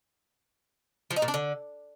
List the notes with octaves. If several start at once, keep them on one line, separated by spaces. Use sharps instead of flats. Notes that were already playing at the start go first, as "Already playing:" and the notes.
F3
D#4
A#2
D4
D3